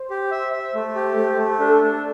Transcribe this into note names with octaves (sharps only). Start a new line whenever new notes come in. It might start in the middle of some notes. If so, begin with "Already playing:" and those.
Already playing: C5
G4
E5
E5
A3
G4
A3
A3
G4
D4 A4
D4